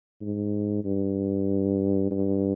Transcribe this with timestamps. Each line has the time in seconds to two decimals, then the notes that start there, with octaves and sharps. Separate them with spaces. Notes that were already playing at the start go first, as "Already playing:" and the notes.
0.22 G#2
0.85 G2
2.11 G2